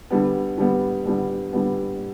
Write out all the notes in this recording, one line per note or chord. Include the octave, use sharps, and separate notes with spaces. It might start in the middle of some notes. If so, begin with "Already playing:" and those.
D3 G3 B3
D3 G3 B3
D3 G3 B3
D3 G3 B3